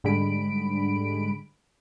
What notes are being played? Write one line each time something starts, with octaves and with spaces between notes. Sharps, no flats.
G#2 D3 G3 G#3 B5 D7